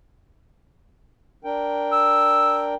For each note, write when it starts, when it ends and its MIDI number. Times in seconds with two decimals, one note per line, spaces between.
1.44 2.74 62
1.44 2.74 70
1.44 2.74 79
1.93 2.63 88